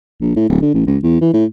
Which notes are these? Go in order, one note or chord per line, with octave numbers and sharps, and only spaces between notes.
A#1
A2
D1
D3
A1
C#2
E2
E3
A2